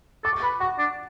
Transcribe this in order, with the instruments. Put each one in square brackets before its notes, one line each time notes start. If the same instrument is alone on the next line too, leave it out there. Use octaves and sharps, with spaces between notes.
[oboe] A4 [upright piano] D6
[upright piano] C#6
[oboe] B4 [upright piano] D6
[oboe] F#4 [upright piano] F#5
[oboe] D4